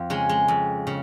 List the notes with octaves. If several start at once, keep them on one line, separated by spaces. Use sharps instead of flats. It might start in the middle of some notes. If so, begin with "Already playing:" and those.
Already playing: F2 F4
C#3 G#3
G#3
F2
C#3